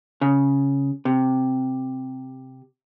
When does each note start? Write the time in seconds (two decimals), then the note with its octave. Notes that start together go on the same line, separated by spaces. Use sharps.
0.21 C#3
1.05 C3